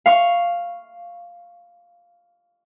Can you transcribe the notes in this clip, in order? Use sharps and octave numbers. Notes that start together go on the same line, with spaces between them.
F5 C#6